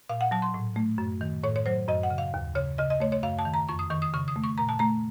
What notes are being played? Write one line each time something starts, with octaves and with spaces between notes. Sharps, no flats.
A#2 F5
F#5
F#3 A5
C6
A2
A3
F#2
D#3
A2 C#5
C#5
F#3 C5
F#2 D#5
F#5
C#3
F5
D#2
C#3 C#5
C#3 D#5
D#5
A3 C#5
C#5
F#2 F5
A5
D#3
A#5
F2 C#6
D#6
D#3 C#6
D#6
C#3 C#6
D#6
A3
C#6
A#2 A#5
A5
A3 A#5